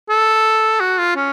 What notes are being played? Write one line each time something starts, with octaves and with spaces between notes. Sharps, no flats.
A4
F#4
F4
C#4